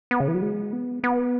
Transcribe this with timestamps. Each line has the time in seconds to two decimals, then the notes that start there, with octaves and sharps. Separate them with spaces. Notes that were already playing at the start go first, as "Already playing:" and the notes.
0.11 B3
0.20 C#3
0.28 E3
0.34 F#3
0.42 G#3
0.73 B3
1.04 B3